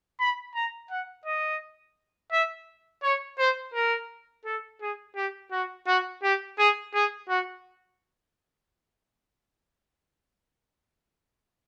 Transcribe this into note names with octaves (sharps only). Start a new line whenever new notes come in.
B5
A#5
F#5
D#5
E5
C#5
C5
A#4
A4
G#4
G4
F#4
F#4
G4
G#4
G#4
F#4